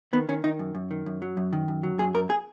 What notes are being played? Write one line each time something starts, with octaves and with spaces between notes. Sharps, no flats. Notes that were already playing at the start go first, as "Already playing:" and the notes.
D#3 B3
D#3 C#4
D#3 D#4
F#2
F#2
D#3
F#2
F#3
F#2
D#3
F#2
F#3
F#2 G#4
F#2 A#4
G#4